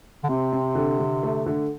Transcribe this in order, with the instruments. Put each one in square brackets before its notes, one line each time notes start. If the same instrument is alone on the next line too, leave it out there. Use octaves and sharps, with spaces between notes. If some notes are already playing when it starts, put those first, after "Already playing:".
[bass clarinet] D3
[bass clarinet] C3 [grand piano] C4
[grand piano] C4
D3
D3
A3
D3